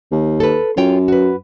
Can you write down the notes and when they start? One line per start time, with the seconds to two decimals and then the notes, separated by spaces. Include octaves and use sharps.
0.12 D#2
0.40 A4 B4
0.77 F#2 F4 C#5 G5
1.08 F#4 B4